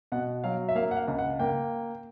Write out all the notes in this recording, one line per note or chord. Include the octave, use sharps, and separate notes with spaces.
B2 F#5
F#3 F5
E5
A#3 F5
F#5
F5
C#2
F#5
A#3 G5